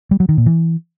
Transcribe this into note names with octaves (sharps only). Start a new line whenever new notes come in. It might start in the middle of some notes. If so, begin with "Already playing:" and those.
G3
F#3
D#3
A#2
E3